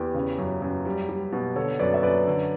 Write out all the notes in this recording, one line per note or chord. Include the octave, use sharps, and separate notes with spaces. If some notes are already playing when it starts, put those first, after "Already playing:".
Already playing: E2 G4 B4
C#3
F#2
F#2
G3
G3
B2
D3 A4 C#5
F#2 B4 D5
E5
F#2 B4 D5
D3